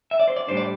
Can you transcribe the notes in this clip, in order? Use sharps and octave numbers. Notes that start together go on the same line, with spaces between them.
E5
D5
C5
D5
A2 G3 D4 C5
D5